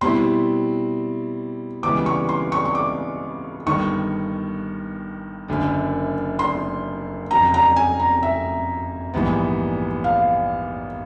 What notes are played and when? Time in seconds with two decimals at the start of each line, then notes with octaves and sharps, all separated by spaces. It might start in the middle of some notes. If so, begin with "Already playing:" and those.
0.01 B2 G3 C4 E4 C6
1.83 C#2 C#3 E3 G3 B3 D6
2.06 C#6
2.29 C6
2.52 C#6
2.65 C#6
2.75 D6
3.66 G1 G2 D#3 C#6
5.48 F#1 F#2 D3
6.39 C6
7.31 F2 C#3 F#3 A#5
7.54 A#5
7.76 G#5
8.00 A#5
8.23 E5
9.14 A#1 G#2 E3 G3 B3
10.04 F5